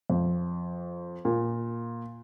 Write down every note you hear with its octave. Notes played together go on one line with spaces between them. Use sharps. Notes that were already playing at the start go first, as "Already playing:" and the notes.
F2
A#2